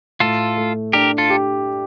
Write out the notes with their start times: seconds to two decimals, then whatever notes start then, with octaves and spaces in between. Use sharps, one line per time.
0.20 A2 F4 A4
0.57 A3
0.93 D4 G4 A#4
1.18 F4 A4
1.30 G4